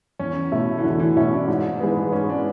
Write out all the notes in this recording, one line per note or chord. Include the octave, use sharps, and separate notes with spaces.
E2 C#4
B2 A3 E4
E3
E2 D3
E3
B2 A3 C#4 E4
D4
G#2
E3 G#3 B3
G#2 C#4
D4